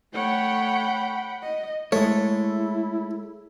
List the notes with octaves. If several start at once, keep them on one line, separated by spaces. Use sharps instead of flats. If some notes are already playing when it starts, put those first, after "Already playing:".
A3 C#5 F#5 G5 B5
D#5
G#3 A3 E4 C#5